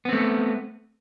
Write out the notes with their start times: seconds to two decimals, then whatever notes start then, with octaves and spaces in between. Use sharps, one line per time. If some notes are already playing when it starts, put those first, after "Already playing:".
0.05 B3
0.09 C4
0.12 A3